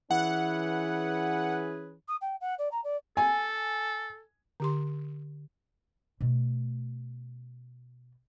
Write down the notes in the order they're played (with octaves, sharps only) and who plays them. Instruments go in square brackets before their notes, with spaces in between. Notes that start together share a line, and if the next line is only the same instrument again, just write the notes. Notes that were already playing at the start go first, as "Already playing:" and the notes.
[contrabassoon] E3 [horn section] C#4 G#4 B4 [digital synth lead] F#5
[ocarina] D#6
G5
F#5
D5
A#5
D5
[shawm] A4 [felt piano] G#5
[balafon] D3 G4 C6
[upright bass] B2 A3